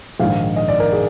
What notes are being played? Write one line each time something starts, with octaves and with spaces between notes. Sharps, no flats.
A#1 G#2 D#3 F5
D#5
D5
A#4
G#4